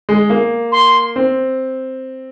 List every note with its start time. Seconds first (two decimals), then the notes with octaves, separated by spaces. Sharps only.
0.09 G#3
0.30 A#3
0.72 C6
1.16 C4